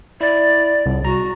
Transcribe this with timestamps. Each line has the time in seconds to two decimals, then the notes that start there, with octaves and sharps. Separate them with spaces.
0.21 E4 D5
0.86 C2
1.05 F#4 A#5